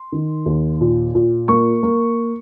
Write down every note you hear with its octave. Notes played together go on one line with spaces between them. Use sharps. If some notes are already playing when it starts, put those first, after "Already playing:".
Already playing: C6
D#3
D#2
A#2
A#2
A#3 C#6
A#3